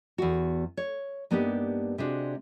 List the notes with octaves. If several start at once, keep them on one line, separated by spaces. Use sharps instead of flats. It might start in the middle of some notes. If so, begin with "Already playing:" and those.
E2 F#4
C#5
G2 A#3 B3 D4 D#4 G4
C3 G#3 D4 F#4